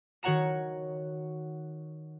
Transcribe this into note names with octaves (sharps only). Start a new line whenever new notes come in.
D#3 F#4 C#5 F#5 A#5 E7